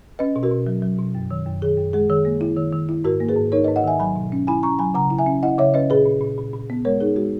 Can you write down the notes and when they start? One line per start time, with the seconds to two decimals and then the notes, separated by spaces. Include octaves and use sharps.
0.19 C#4 B4 D#5
0.36 B2
0.43 F#4 A#4
0.51 B2
0.67 F#3
0.82 F#3
0.99 B2
1.15 F#2
1.31 D#3
1.46 F#2
1.62 D#3 G#4
1.78 F#2
1.93 G#3 G#4
2.10 D#3 G#4
2.25 A#3
2.41 E4
2.57 D#3
2.73 D#3
2.89 E4
3.04 G#2 F#4 A#4
3.20 A#3
3.29 G#4 B4
3.36 G#2
3.52 D#4 A#4 C#5
3.64 G#2 B4 D#5
3.76 D#5 F#5
3.84 D#3 E5 G#5
3.99 F#3 G#5 B5
4.16 B2
4.32 C#4
4.47 E4 G#5 B5
4.63 C#4 A#5 C#6
4.79 F#3 G#5 B5
4.94 C#3 F#5 A#5
5.10 E4
5.18 E5 G#5
5.26 C#4
5.43 E4 D#5 F#5
5.58 C#3 C#5 E5
5.74 C#4 B4 D#5
5.90 A#2 G#4 B4
6.06 A#2
6.21 A#2
6.38 A#2
6.53 A#2
6.70 B3
6.85 G#3 A#4 C#5
7.00 D#4 G#4
7.16 G#3 F#4